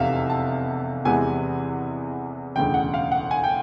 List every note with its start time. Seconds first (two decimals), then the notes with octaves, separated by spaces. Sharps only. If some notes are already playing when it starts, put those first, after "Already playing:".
Already playing: F1 E2 C3 E5 F5
0.30 A5
1.05 E2 C3 E3 G#3 B3 G#5
2.56 E1 D2 C#3 E3 G5
2.74 F#5
2.94 F5
3.12 F#5
3.31 G#5
3.44 G5